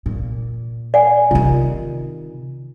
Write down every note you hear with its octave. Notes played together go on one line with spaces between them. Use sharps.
A#2
D5 F#5 G#5
C3 D#3 F4